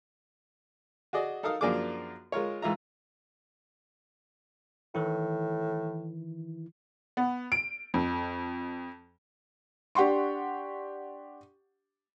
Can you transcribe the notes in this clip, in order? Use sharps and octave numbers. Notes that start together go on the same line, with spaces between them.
F#4 G#4 D5 D#5
D#4 A4 A#4 F5 D#6
F#2 F3 A#3 D4 G#4 D6
G#3 F4 A#4 C#5
G#2 E3 F4 E5 A#5
A2 D#3 E3 E4
B3
D7
F2
D4 G4 F#5 C6 C#6